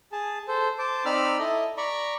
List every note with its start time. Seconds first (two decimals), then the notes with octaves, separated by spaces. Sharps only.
0.12 G#4 A5
0.48 A4 C5
0.78 C5 A5 D6
1.05 C4 D#4 D5 B5 E6 F6
1.39 E4 A4 D#5
1.77 D5 A#5 B5 C#6